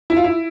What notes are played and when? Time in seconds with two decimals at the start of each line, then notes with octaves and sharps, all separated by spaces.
0.10 E4
0.17 F4
0.24 E4